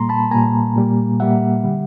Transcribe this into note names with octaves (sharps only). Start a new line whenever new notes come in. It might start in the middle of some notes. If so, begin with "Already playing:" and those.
Already playing: A#2 G3 A#3 A#5 C6
A5 B5
A#2 G3 A#3 G#5 A#5
A#2 G3 A#3
A#2 G3 A#3 E5 F#5
D3 G3